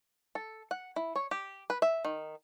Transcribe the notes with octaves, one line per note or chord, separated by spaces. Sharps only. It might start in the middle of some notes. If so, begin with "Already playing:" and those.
A4
F#5
E4
C#5
G4
B4
E5
D#3